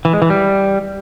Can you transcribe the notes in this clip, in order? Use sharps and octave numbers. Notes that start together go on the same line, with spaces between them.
E3
G#3
E3
G3